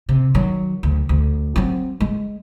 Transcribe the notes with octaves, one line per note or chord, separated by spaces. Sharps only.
C3
D#3 F#3
D2
D2
F#3 C4
G#3